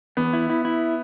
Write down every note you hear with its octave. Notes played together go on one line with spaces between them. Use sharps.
E2 B3
E4
E4
E4